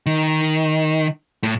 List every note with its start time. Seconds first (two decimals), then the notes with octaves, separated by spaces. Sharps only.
0.06 D#3
1.43 A2